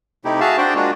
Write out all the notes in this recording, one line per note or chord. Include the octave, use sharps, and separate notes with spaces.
C3 A3 D#4 E4 G4
F#4 G#4 E5 F5 A5
D4 F#4 C5 D5 G5
G#3 A#3 D4 F4 F#4